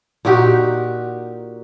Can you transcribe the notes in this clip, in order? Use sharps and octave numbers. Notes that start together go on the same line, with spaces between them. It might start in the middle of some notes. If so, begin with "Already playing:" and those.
A#2 D#4 F#4 G4